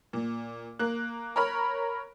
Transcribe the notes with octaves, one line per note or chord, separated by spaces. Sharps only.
A#2
A#3 F#6
A#4 C#5 B5 F6